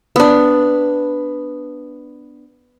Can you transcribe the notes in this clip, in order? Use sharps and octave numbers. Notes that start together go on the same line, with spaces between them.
B3 D4